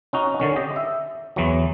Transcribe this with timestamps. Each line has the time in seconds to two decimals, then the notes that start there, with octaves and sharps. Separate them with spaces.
0.13 C#4 D#4 F#4
0.40 D3 D#3 C#4
0.56 G4 D#5
0.76 E5
1.36 E2 E3 F#3